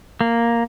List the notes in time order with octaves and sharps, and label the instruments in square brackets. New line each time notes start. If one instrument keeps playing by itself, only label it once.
[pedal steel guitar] A#3